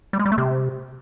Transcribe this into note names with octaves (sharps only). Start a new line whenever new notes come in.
G3
G#3
G3
A3
C3